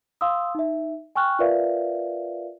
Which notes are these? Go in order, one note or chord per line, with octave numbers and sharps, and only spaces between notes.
F5 C6 D#6 E6
D#4 E5
G5 G#5 C#6 F6 F#6
F4 A#4 B4 D5 E5 F5